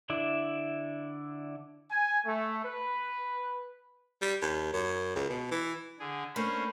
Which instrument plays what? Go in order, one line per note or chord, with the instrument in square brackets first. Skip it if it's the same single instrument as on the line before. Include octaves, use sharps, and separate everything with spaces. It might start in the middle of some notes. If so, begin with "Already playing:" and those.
[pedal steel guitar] D3 D4 E4
[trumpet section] G#5
A3
B4
[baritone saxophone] G3
D#2
F#2
C#2
B2
E3
[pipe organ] D3 G#4
[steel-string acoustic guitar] A3 A#3 D4 [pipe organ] C#4 C5 [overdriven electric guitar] B5